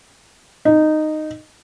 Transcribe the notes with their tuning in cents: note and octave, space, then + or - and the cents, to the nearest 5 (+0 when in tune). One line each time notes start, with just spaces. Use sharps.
D#4 -10